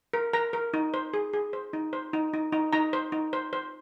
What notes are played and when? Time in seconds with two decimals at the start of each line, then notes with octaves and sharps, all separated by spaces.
0.13 A#4
0.33 A#4 A#5
0.53 A#4
0.74 D#4
0.94 C5
1.14 G#4
1.33 G#4
1.53 C5
1.73 D#4
1.93 C5
2.13 D#4
2.34 D#4
2.52 D#4
2.73 D#4 A#5
2.93 C5
3.12 D#4
3.33 C5
3.53 C5